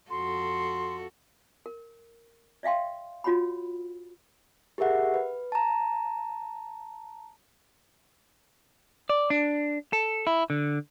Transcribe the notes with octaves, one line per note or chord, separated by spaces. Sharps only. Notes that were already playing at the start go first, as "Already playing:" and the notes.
F2 F#4 A4 C6
A#4
D5 E5 F5 G5 C6
F4 F#4 C#5 F#5 B5
G4 G#4 A#4 E5 F#5
B4
A5 A#5
D5
D4
A4
E4
D3